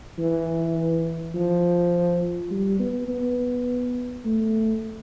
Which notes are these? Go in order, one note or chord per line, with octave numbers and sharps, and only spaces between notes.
E3
F3
G3
B3
B3
A3